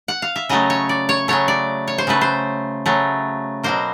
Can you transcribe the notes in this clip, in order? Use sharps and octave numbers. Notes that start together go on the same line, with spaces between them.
F#5
F5
E5
C#3 F#3 A3 D#5
C#5
D5
C#5
C#3 F#3 A3 C#5
D5
C#5
C5
C#3 F#3 A3 B4
C5
C#3 F#3 A3
B2 F#3 A#3 C5